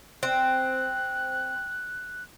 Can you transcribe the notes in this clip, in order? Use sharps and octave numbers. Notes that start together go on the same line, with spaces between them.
C4 F#6